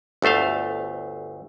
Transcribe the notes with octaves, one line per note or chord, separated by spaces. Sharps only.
G1 D2 A3 C5 F5